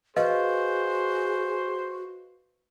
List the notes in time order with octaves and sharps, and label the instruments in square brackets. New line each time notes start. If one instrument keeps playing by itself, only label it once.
[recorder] F#4 [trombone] G#4 [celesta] B4 D#5 F5 [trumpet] C5